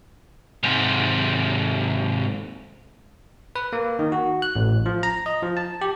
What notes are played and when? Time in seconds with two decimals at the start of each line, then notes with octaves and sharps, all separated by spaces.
0.63 G#2 C3
3.56 B4
3.73 A#3
3.99 D#3
4.12 F#4
4.42 F#6
4.56 A1
4.86 F3
5.03 A#5
5.26 D#5
5.43 F3
5.57 A5
5.81 G4